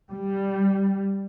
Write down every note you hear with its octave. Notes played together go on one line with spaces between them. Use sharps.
G3